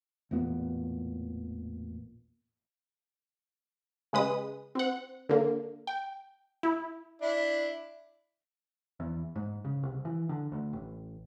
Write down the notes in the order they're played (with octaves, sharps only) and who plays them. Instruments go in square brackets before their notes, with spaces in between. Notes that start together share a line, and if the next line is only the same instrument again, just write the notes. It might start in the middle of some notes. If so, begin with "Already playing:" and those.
[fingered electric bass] A1 E2 A#2 B3
[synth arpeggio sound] C#3 G#3 B4 D#6
C4 F#5
D3 A#3
G5
E4
[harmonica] D4 E4
[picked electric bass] E2
G#2
C#3
C2
E3
D3
D2
A1